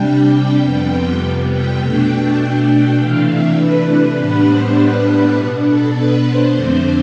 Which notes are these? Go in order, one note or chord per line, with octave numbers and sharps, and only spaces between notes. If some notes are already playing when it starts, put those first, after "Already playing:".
Already playing: C3 G3 D4 G5
F2 C3 G3 B3 G5
G5
B2 A3 D4
C3 E3 A3 D4 F5
E5
B4
A2 G3 B3 D4 B4
C5
B4
B2 B3 D4
A4
B4
C5
F2 D3 A3 C4